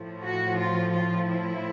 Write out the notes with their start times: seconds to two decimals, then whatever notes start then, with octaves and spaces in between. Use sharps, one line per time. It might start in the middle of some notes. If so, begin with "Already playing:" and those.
Already playing: A2 F3
0.22 F#4
0.58 F4
0.93 F4
1.29 E4